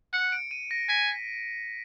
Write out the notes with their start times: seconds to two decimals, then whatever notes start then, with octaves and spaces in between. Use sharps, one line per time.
0.13 F#5 C#7
0.32 D7
0.51 D#7
0.71 A#6
0.89 G#5 B6